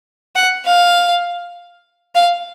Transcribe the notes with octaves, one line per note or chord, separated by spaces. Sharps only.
F#5
F5
F5